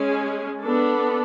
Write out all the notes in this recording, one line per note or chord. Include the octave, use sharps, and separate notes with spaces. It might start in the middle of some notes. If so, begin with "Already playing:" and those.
Already playing: G#3 C#4 G#4
B3 D4 A4